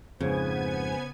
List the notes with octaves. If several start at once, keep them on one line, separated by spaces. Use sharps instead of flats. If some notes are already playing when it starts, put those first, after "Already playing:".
F2 G#2 C#3 B3 C5 G#5 G#6